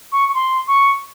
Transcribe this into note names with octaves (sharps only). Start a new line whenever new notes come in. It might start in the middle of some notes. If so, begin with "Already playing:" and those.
C#6
C#6
C6
C#6